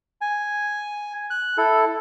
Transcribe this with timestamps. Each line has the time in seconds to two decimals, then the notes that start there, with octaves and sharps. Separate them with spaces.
0.21 G#5
1.30 F#6
1.58 E4 A4